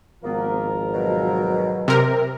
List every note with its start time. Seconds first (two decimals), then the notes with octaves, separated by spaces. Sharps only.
0.24 G#1 F3 A#3 B3 A#4
0.94 B2 F#3
1.88 C3 A#4